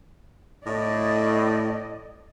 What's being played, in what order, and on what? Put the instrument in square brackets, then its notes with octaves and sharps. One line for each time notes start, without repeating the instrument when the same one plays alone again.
[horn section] A2 [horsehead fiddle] D5 D#5